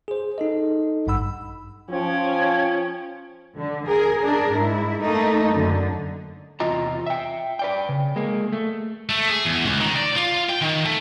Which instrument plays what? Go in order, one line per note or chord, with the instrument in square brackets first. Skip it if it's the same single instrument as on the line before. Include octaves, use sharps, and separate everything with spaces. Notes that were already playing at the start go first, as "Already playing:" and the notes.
[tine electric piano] G#4 C5
D#4 A4 D#5
A1 G2 F#5 B5 E6
[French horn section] F3 [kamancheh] C#4 [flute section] G5 G#6
[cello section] D3
G#4 A#4
D4 G#4 A#4
G#2 E4
A3 A#3 D#4
F#2 D3
[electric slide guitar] E2 C3 F4 D#5 A#5
E5 G5
B4 D5 G5
C#3
G#3 A#3
A3
[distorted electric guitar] A3
G#4
E2
C#2
D#3
D5
F4
G5
D#3
A3